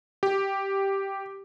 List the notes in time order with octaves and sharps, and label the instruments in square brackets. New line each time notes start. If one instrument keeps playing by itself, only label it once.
[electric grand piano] G4